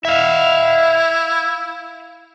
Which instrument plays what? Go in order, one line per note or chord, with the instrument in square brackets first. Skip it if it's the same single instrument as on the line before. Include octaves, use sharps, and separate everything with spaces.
[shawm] E4 [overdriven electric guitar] E5 F5